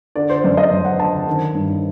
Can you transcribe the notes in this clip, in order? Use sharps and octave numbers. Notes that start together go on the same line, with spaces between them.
D3 D5
C5
F#2 D5
D#5
F#2
F#5
D3 A5
D#3
G2